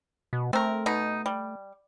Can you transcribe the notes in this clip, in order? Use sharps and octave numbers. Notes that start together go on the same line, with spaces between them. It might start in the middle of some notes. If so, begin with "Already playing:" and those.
B2
A3 C4 A#4
B2 D#4
G3